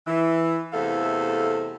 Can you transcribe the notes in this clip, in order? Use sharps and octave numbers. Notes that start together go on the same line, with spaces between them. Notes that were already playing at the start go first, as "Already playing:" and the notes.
E3
E2 C3 A3 A4 F5